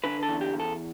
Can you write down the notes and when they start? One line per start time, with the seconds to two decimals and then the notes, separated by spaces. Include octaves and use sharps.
0.04 D3 B4
0.23 A4
0.29 E2
0.41 G4
0.53 E2
0.60 A4